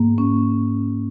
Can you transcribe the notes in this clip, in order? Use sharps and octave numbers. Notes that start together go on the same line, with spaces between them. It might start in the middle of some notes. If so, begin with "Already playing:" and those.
Already playing: G#2 A#3
C#4